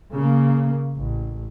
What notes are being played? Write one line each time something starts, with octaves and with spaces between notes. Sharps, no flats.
C#3 A#3
A1